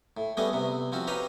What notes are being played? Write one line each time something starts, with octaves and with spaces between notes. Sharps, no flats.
A2
G3 A3 B3 C#4 G#4 D#5
C3 B3
F3 C4 C#4 F#4
D#4 G4 B4 C#5 D#5 F5